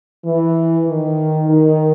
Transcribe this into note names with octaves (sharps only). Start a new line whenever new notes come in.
E3
D#3
D#3